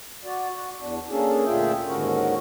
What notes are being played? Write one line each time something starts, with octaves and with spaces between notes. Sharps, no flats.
F#4 D5
F#4
E2 D4
A#3 C#4 D4 G#4 A4
D2 A#2 F4 G#4 E5 G5
D#2 G#2 D3 C#4 F#4 A#4